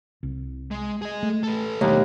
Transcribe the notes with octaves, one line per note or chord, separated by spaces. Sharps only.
C2
G#3
G#4 D#5
A3
A4 B4
D#2 B2 D3 F#3 G#3 A3